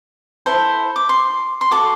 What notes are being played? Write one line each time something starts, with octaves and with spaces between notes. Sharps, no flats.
E4 A4 C5
D6
C6
C6
F#4 A4 D6